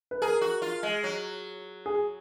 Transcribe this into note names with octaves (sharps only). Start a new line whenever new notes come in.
B4
G#4 A#4
F#4
F4
G#3
F#3
G#4